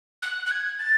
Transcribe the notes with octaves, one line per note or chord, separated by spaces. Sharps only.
F#6
F#6
G#6
A6